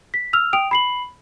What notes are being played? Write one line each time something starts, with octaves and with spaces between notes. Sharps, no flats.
B6
E6 F6 F7
G5 D#6 D7 F7
B5 C7 F#7